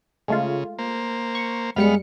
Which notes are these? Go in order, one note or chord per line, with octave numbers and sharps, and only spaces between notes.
C#3 G#3 A3 F4
A#3 C5
C#6
F#2 G3 G#3 B3 F5 C#7